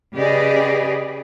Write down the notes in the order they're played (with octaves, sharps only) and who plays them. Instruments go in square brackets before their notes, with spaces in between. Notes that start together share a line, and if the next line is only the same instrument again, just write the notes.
[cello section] C#3 G4 G#4 B4 D5 D#5